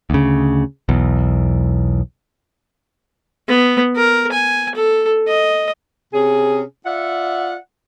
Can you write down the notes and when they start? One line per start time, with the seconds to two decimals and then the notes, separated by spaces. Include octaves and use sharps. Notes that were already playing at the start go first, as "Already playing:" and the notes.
0.10 D2 C#3
0.89 B1 E2
3.49 B3
3.96 A#4
4.32 G#5
4.75 A4
5.28 D#5
6.14 C3 C#4 G#4
6.86 F4 D5 E5 F#5